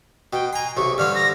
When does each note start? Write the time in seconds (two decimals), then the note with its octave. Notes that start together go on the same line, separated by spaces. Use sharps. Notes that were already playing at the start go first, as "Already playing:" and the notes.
0.33 B2 G5
0.53 G#5 A#5 C6
0.77 B1 C3 C#6
0.98 G2 D3 C4 F6
1.15 A#6